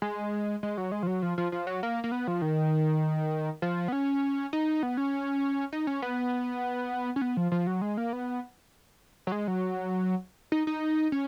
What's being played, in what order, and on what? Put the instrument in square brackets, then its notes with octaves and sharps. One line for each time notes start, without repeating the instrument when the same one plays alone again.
[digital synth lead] G#3
G#3
F#3
G#3
F3
F#3
F3
F3
F3
F#3
A#3
A#3
B3
F3
D#3
F3
B3
C#4
D#4
B3
C#4
D#4
C#4
B3
C#4
B3
F3
F3
F#3
G#3
A#3
B3
F#3
G#3
F#3
D#4
D#4
C#4